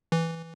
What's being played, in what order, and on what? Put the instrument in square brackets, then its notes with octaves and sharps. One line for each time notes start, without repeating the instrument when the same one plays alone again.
[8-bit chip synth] E3